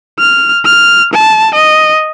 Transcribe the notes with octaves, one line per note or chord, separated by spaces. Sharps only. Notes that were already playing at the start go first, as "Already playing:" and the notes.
F6
F6
A5
D#5